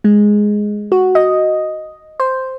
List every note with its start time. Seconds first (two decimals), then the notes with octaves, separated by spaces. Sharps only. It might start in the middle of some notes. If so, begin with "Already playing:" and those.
0.04 G#3
0.92 F#4
1.15 D#5
2.20 C5